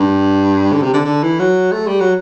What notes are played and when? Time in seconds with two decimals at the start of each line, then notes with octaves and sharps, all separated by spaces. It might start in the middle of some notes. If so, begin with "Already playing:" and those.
Already playing: G2
0.73 D3
0.83 C3
0.93 D3
1.05 D3
1.23 E3
1.39 F#3
1.72 A3
1.87 G3
2.01 F#3